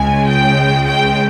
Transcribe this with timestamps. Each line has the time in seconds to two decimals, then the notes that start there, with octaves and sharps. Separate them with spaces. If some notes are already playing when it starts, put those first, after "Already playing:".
Already playing: C#2 C#3 G#3 G#5
0.27 G5
0.87 G5